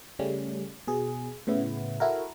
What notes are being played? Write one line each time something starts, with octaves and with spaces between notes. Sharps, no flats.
C#3 G3 A3 C#4
B2 G#4
A2 C#3 B3 E4
E4 F#4 A4 A#4